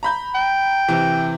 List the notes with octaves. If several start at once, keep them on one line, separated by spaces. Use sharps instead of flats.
A#5 B5 G6
G5
C3 E3